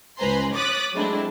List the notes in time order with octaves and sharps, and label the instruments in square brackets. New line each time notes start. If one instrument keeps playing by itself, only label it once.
[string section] C#2 B4 C5 G#5 A#5 C6
C#5 D6 D#6 F#6 A6 B6
F#3 G#3 A3 C4 D4 E4